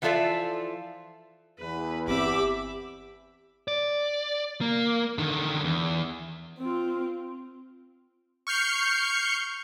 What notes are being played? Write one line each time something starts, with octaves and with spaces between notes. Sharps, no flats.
E3 F3 F4 A4 D5 E5
E2 B4
G1 C4 G4 E5 B5 D6
D5
A#3
D3 D#3
E2
C4 F4
C#6 F6 G6 C7 C#7